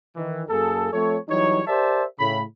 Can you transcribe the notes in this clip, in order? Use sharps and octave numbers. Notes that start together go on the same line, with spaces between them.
D#3 E3
F#2 A#3 G#4 A4
F3 A3 C4 A4 C#5
E3 F#3 G3 D#4 C#5
G4 A#4 C5 D5 E5 A5
A2 C#3 B5